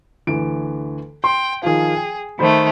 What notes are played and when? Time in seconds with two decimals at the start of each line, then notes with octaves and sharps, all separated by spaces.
0.27 D2 E3 D7
1.24 G5 C6
1.63 D#3 F3 F4 G#4
1.97 G5
2.39 D#3 A3 C5 B5